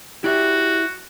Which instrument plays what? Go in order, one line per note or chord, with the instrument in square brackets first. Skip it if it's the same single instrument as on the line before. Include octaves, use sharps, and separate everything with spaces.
[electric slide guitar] E4 D5 E5 [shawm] F#4 [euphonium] G4